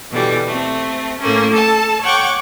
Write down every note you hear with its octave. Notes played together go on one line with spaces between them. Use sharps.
B2 D3 E3 G3
A3 C4
A2 A3 A#3 C#4
A4 A5
C#5 F#5 G5 C#6 D6